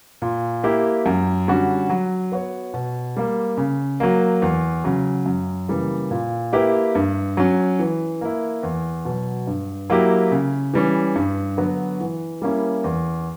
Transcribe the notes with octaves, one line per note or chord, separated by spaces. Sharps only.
A#2
A#3 E4 G4
F#2
D3 G3 C#4 F#4
F#3
B3 F#4 C#5
B2
G3 A#3
C#3
F#3 A#3
E2
C#3 F#3
F#2
C#3 E3 G3 A#3
A#2
A#3 E4 G4 B4
G2
F#3 C#4
E3
A#3 E4
E2
B2 F#3
G2
F#3 A#3 E4 G4
C#3
E3 G3 C#4
G2
D3 F#3 B3 F#4
E3
G3 A#3 C#4 E4
E2